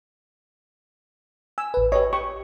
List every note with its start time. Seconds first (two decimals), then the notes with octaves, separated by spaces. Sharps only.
1.58 G#5 E6
1.74 A1 B4
1.92 G4 B4 C#5 D#5
2.13 G4 C#6